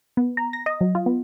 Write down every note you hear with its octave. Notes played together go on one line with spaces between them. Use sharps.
B3
A#5
A#6
D#5
F#3
F4
B3